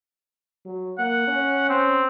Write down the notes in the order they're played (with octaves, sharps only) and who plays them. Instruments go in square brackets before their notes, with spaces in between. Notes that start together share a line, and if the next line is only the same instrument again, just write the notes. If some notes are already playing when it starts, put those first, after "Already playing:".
[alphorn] F#3
[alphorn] A#3 [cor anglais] F#5
[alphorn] C#4
[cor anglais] C4